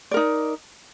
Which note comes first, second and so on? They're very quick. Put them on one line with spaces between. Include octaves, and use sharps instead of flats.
D5 A#4 D#4